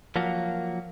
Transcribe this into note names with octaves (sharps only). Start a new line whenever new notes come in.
F3 F#3 A#3 F#4